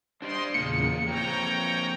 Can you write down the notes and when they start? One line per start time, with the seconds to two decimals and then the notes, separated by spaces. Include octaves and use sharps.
0.22 D4 G4 C5 D5 D#5 C6
0.54 E2 A#2 C#3 A#3 G#4 C#7
1.06 F3 A#3 C4 C#5 G5 A#5